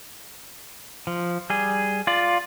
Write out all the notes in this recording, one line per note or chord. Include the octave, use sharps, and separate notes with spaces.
F3
G3 G#4
F4 D5